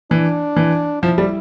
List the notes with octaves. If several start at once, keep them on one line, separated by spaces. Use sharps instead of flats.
E3 D4
E3
F3 E4
G3